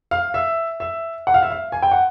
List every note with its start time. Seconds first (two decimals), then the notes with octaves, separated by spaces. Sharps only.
0.11 F5
0.34 E5
0.80 E5
1.27 F#5
1.34 F5
1.43 E5
1.50 F5
1.72 G#5
1.82 G5
1.92 F#5